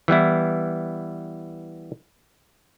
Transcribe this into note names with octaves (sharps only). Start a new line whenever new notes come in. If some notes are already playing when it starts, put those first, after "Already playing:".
E3 G3 B3 E4